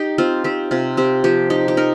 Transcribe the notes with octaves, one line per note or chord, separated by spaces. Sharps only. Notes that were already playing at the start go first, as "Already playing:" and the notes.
Already playing: D#4 G4
C4 F4
C4 G4
C3 F4
C4 G4
F3 G4
D#4 G4
G4
D#4 A#4